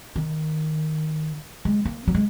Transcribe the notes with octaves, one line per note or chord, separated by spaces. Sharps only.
D#3
G#3
A#3
F#3
G#3